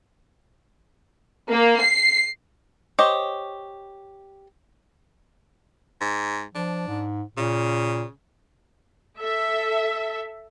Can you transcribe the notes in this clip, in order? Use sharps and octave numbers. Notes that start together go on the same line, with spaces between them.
A#3
C7
G4 C5 C#5 D#5
G#2
F3 D4
G#2
A#2 C#3
A4 E5